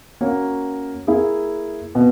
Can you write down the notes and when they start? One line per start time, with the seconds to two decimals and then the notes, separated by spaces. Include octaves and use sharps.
0.21 A#3 C#4 F#4 C#5
1.07 A#3 E4 G#4
1.95 B2